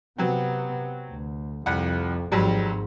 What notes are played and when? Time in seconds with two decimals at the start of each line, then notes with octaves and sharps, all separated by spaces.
0.18 C3 F#3 B3 C4
1.10 D2
1.66 C2 F2 F#5
2.32 G#1 F2 G#2 F#3 G3